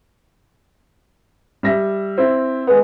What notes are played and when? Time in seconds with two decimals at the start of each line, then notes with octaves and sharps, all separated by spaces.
1.63 G3 E5 A#6
2.18 C4 E4
2.67 G#3 B3